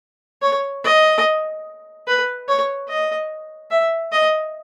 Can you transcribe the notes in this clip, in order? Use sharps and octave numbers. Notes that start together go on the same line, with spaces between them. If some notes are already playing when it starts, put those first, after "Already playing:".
C#5
D#5
B4
C#5
D#5
E5
D#5